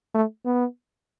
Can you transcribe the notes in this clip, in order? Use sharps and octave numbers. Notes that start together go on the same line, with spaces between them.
A3
B3